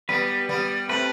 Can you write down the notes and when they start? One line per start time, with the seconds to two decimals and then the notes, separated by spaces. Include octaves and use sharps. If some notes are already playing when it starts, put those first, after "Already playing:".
0.09 G3 B3 B4
0.49 G3 B3
0.89 A3 C4 B4